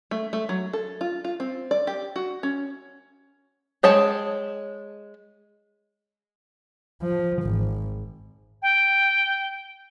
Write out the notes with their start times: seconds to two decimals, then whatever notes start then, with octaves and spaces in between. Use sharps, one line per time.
0.11 A3
0.33 A3
0.49 F#3
0.73 A4
1.01 F4
1.24 F4
1.40 C4
1.71 D5
1.87 G4
2.16 F#4
2.43 C#4
3.83 G#3 C#5 G5 A5
7.02 F3
7.44 G#1
8.62 G5